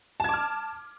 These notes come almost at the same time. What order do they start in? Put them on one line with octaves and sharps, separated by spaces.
A5 G#6 D6 F6